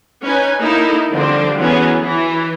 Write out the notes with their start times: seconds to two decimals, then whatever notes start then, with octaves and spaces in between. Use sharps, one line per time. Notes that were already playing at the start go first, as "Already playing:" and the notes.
0.22 C#4 D#4 B4 G#5
0.59 A#3 D#4 E4 A4
1.11 D3 F3 G3 C4 D4 C5
1.57 E3 F#3 B3 C#4 G#4
2.00 E3